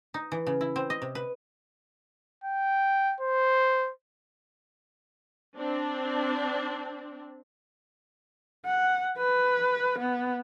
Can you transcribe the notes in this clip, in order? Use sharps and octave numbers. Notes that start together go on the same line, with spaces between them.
D#4
E3
C#3
E4
C4
D#5
C3
B4
G5
C5
C4 D4
F#5
B4
B3